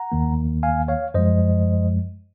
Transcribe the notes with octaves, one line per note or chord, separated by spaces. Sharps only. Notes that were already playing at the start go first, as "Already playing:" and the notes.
Already playing: F#5 A#5
D#2 D#3 A#3
F5 G#5
C#5 F5
F#2 F3 G#3 C5 D#5